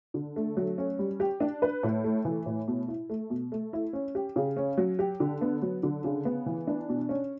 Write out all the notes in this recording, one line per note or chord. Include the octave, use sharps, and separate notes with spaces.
D3
A3
F#3
C#4
G3
G4
D4
B4
A2
A3
E3
A2
B2
E4
A3
B2
A3
E4
C#4
G4
C#3
C#4
F#3
G4
D3
B3
F#3
D3
C#3
B3
E3
D4
B2
C#4